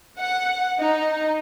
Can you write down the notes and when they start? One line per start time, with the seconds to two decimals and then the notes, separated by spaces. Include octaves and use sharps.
0.19 F#5
0.79 D#4